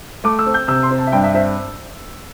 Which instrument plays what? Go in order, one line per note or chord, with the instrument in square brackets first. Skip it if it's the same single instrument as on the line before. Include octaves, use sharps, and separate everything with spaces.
[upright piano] A3 D6
E6
C4
G6
C3 E6
C6
C4
A5
E5
G2 G5
E5
C4 E5